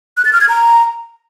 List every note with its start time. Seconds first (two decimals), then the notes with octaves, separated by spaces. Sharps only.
0.17 F#6
0.25 A6
0.33 F6
0.41 G#6
0.49 A#5